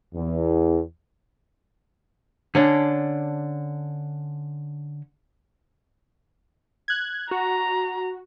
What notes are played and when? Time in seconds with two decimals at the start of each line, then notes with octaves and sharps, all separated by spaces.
0.15 E2
2.55 D3 C#4 D4
6.88 F#6 G#6
7.31 F#4 A#5